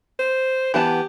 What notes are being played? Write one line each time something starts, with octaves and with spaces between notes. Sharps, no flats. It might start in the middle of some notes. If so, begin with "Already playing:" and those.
C5
E3 B3 G4 A5